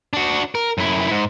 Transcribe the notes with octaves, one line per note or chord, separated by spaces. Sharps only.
D4 F#4
A#4
F#2 E4
G#2